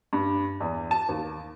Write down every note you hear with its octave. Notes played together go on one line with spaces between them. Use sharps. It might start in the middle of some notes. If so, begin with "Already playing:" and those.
G2
E2
A5
D#2